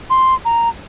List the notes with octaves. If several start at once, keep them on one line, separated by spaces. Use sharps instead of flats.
C6
A#5